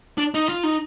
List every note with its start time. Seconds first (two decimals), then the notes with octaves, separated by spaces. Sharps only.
0.18 D4
0.34 D#4
0.49 F4
0.63 D#4